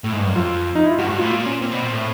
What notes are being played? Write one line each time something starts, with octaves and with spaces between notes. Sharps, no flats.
A2
G#2
G2
F#2
F2 F4
D#4
E4
F4
G2 F#4
G#2 F#4
A2 F4
A#2 F4
C#4
A#2 C4
B2
A#2
A2